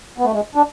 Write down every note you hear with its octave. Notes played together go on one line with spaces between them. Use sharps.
B3
A3
G#3
D4